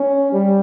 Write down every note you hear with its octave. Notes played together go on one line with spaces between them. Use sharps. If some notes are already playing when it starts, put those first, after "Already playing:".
Already playing: C#4
G3